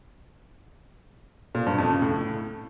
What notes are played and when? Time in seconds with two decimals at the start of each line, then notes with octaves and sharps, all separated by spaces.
1.55 A#2
1.66 G2
1.78 F2
1.90 C#3
2.02 A2